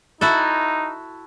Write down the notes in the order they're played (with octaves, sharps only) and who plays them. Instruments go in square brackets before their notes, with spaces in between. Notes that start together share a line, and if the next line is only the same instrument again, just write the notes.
[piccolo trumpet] D#4 [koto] E4 F#4 A4